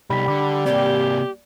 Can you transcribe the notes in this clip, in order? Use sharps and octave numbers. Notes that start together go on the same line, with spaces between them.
C2 G3 D#4 B5 B6
D3 D6
C3 A#3 G4 D5